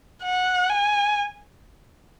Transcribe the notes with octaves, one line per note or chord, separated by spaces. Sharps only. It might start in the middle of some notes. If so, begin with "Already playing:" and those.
F#5
G#5